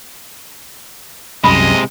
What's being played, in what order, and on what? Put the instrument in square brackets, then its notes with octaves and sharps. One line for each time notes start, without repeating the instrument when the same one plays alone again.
[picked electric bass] C2 F#2 [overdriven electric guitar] C3 G#3 [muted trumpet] D#5 [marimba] B5